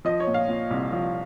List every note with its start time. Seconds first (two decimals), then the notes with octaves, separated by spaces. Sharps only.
0.05 F3 D#5
0.20 C#5
0.27 A#2
0.34 F5
0.48 A#2
0.70 C2
0.93 F3